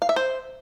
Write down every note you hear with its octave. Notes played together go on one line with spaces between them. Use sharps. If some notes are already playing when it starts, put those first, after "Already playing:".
F5
E5
C5